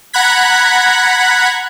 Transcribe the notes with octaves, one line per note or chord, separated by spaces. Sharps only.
F#5 A#5 B5 F#6 G#6 B6